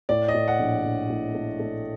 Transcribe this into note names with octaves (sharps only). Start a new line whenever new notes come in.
A2 D5
D#5
A2
F#5
A#1
A#1
A2
A3
A3